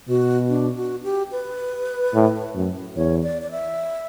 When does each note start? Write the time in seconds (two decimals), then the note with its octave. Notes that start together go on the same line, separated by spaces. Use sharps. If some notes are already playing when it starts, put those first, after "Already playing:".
0.08 B2 F#4
0.49 D4
0.77 F#4
1.04 G4
1.32 B4
2.14 A2
2.55 F#2
2.96 E2 C#5
3.23 D5
3.42 D5
3.51 E5